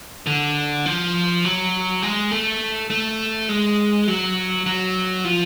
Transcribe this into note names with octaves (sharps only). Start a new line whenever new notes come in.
D3
F3
F#3
G#3
A3
A3
G#3
F#3
F#3
F3